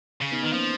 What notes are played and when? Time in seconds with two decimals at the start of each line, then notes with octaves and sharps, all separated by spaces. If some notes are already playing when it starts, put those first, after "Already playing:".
0.22 C#3
0.32 B3 D#4
0.43 D#3 B3 D#4
0.53 F3 A#3 C#4